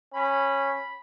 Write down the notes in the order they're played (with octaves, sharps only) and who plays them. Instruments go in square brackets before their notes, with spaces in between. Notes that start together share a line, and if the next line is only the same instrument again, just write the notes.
[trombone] C#4 [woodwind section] B5